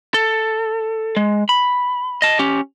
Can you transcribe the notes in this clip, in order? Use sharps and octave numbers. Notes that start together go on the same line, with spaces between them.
A4
G#3
B5
D#5 A5
C#4 G4